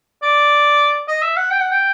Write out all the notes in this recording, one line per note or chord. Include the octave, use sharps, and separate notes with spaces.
D5
D#5
E5
F#5
G5
F#5
G5